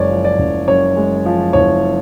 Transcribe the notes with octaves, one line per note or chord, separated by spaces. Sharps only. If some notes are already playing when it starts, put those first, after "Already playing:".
Already playing: F#1 F#2 G#3 C#5 D5
F3
D5
F#1
F#2 C#5
G#3
F3
F#1 C#5